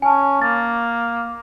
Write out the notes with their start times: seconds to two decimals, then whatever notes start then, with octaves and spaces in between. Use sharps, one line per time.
0.02 C#4 G#5 A5
0.42 A#3 A6